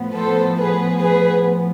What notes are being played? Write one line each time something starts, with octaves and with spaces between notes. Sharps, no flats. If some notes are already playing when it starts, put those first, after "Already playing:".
Already playing: A2 F3 B3
A4 C5
G#4 B4
G#4 B4